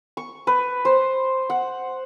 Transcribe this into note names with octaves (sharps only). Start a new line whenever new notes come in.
C#6
B4
C5
F#5